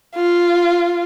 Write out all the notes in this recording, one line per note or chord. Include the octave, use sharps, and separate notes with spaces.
F4